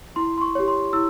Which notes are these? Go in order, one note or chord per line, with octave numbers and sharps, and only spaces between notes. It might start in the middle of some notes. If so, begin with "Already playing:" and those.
E4 C6
C6
C#6
G4 C#5
C6
E4 E6